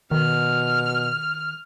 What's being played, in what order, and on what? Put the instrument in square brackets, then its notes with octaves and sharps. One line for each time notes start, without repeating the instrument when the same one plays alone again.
[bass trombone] B2 [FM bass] D#3 [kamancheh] F6